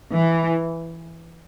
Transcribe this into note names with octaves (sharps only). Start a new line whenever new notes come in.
E3